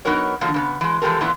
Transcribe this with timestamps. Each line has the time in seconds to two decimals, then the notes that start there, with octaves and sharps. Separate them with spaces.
0.05 F#3 B3 D#4 F#4 A#4 C#5
0.41 D3 D#3 F3 F#3 A#3
0.54 C#3 A3 B3
0.81 E3 G#3
1.02 E3 F3 G#3 G4 A4 A#4
1.21 F#2 A#2 E3 B3 E4 F4